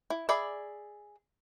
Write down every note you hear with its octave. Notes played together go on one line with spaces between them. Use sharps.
E4
G#4 D5 E5 B5